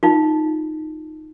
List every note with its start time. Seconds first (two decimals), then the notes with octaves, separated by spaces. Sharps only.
0.03 D#4 F4